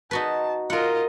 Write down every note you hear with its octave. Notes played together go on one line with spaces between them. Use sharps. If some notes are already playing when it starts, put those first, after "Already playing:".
D#4 F#4 B4 A5
F4 A#4 D#5 F#5